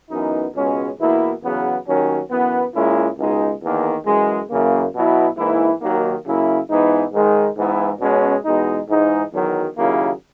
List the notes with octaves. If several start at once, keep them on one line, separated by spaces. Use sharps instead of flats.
F#2 E3 B3 D#4
C#2 B2 G#3 C#4
E2 B2 A#3 E4
E2 C#3 F#3 B3
D#2 D#3 F#3 C#4
F#2 E3 B3
A#2 G#3 C#4 E4
C#2 B2 G#3 D#4
E2 D#3 A#3
F#2 E3 G#3
F#2 C#3 E3 A#3
B2 F#3 B3 E4
G#2 E3 A#3 E4
D#2 D#3 F#3 A#3
C#3 F#3 A#3 E4
G#2 E3 B3 D#4
G#2 D#3 G#3 D#4
G#2 E3 G#3 B3 E4
B2 G#3 C#4
E2 B2 G#3 D#4
G#2 E3 G#3 D#4
E2 D#3 F#3
D#2 C#3 F#3 A#3 E4